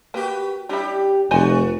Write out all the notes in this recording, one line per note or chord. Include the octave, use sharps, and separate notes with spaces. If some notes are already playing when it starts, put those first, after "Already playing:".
A#3 F#4 G4 B4
G3 C#4 D4 E4 G4
F1 A3 F#4 C5 D#5 G#5